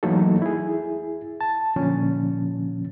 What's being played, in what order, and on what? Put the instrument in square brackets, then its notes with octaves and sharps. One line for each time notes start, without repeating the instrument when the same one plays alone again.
[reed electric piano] E3 F#3 A3 A#3 D#4 A4
E4 G#4
A5
A#2 D3 F3 C#4